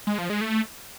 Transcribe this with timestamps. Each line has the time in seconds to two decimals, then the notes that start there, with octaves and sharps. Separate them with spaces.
0.07 G#3
0.18 F3
0.30 G#3
0.41 A3